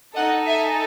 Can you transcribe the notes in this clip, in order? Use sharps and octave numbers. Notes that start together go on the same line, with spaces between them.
D#4 A4 D#5 F#5
E5 G#5